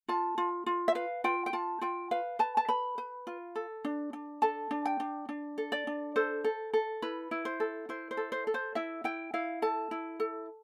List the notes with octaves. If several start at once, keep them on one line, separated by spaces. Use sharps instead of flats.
F4 A5
F4
F4
E5
B4 F5
F4 G5
G5
F4 A5
F4 G5
B4 F5
B4 A5
A5
B4 B5
B4
F4
A4
D4
D4
A4 A5
D4
G5
D4
D4
A4
D5
D4
A4 C5
A4
A4
E4 B4
E4
C5
A4
E4 C5
C5
A4
C5
A4
C5
E4 E5
E4 G5
E4 F5
A4 A5
E4
A4